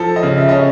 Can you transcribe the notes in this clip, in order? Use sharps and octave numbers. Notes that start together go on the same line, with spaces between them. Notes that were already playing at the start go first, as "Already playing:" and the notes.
Already playing: F3 A4
D#5
C#3
E5
C#4 D#5